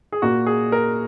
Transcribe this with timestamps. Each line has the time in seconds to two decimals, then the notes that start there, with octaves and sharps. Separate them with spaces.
0.12 G#4
0.22 A#2 A#3 F#4
0.46 G#4
0.72 A#4